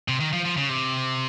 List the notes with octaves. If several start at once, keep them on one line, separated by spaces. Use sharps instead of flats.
C3
D#3
F3
F3
C#3
C3